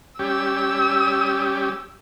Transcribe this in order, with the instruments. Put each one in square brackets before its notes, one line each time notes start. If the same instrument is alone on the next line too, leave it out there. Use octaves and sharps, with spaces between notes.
[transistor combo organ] G3 C#4 G4 [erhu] E6